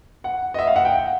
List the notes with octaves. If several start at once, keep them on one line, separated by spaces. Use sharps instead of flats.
F#5
D#5
E5
F5
F#5
G5